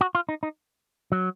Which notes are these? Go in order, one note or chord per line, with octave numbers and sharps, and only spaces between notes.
F#4
F4
D#4
D#4
F#3